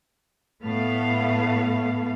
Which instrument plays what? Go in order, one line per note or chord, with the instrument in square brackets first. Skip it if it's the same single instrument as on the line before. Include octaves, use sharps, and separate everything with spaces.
[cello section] A2 A3 B3 F5